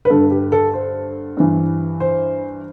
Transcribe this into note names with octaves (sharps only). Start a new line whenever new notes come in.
B4
G2 D3 A4
G4
A4
C5
G2 E3
C5